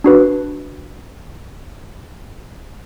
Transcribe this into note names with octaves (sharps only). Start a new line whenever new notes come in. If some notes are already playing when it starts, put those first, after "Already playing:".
D4 F#4 B4